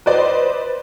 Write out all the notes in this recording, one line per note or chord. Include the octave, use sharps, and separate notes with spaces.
B4 C5 D5 D#5